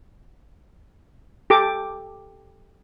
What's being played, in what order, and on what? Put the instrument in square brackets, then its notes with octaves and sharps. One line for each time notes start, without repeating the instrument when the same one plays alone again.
[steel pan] G4 A4 D6